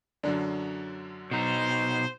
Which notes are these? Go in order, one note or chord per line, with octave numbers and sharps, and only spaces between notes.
F#2 D3 F#3 D4
B2 D#4 C5